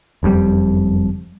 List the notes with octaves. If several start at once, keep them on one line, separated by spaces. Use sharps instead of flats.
F#1 F2 A#2 G3